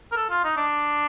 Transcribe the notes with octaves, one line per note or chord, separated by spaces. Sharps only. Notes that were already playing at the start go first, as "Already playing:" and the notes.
A#4
A4
F4
D#4
D4